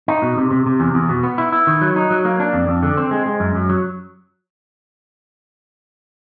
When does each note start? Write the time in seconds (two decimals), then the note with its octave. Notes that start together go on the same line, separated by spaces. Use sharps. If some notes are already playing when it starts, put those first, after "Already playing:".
0.08 D#4
0.22 B2
0.37 C3
0.51 C3
0.66 C3
0.80 E2
0.94 E2
1.09 B2
1.23 B3
1.38 E4
1.52 E4
1.67 D#3
1.81 F#3
1.96 D#4
2.10 F#3
2.25 A#3
2.40 D4
2.53 F2
2.68 F2
2.83 D3
2.97 C4
3.11 G#3
3.26 G#3
3.40 F#2
3.55 F#2
3.69 F#3